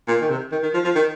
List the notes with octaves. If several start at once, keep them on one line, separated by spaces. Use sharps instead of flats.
A#2
D#3
C3
D#3
D#3
F3
F3
D#3